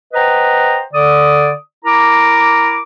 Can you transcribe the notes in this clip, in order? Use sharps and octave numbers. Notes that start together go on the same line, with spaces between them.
B4 C5 D#5 F#5 G5 A#5
D3 D5 D#6
E4 A#4 A#5 D6